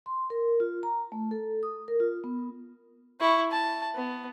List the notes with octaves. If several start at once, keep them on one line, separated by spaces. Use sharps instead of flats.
C6
A#4
F4
A#5
A3
A4
D#6
A#4
F4
B3
E4 C#6
A5
B3